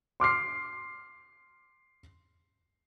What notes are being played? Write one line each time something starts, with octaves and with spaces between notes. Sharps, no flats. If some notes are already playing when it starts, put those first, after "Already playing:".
C6 D6 F6 C7